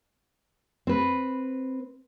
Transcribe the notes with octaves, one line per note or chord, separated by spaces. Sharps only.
C4 B4